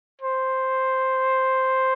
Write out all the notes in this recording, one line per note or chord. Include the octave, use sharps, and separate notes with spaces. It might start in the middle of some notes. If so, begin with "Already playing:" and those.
C5